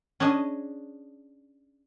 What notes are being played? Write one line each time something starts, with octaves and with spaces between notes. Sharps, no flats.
C#4 D4 G#4 D#5